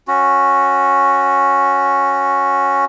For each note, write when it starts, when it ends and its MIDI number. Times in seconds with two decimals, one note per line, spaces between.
0.08 2.85 61
0.08 2.85 66